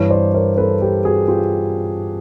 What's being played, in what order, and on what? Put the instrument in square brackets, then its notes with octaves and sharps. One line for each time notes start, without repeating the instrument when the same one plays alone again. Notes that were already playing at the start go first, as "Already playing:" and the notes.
Already playing: [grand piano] G2 E3 B4 C#5
C5 D5
A#4 C5
A4 B4
G4 A4
F#4 G#4
F4 G4